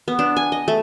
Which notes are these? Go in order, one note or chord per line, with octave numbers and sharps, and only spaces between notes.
B3
D4
G#5
D#5
A3